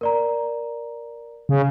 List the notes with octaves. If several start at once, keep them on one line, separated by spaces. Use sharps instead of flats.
A#4 D5 A#5
C#3